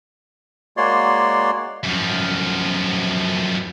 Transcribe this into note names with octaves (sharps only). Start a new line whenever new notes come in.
G#3 A#3 F#4 C#5 D5 C6
F#2 F3